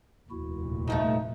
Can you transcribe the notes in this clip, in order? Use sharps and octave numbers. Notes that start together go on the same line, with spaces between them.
F1 D#2 A#2 E4 F#4
G2 F3 A3 D#4